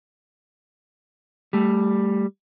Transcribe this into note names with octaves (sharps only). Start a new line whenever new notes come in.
G3 A3